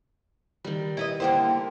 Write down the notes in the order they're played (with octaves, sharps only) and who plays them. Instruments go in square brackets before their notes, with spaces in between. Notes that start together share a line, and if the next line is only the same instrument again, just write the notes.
[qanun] D#3 G3
[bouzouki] E4 B4 D#5
[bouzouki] D3 A#3 E4 [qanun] C5 [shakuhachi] G5